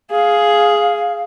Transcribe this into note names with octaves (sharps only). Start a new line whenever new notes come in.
G#4 F5